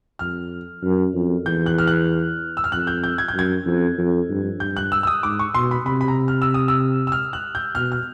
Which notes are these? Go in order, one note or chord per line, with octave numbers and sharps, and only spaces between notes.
F2 F6
F#2
F2
E2 G6
F#6
F6
F#6
E6
F6
F2 F#6
G6
G6
G#6
G6
F#2 G#6
F2
F2
G2
G2 G6
F#6
E6
E6
D#6
G#2 D6
C#6
B2 C6
B5
C3 B5
B5
A#5
F6
E6
D#6
E6
E6
F6
F#6
G6
B2 F6
F6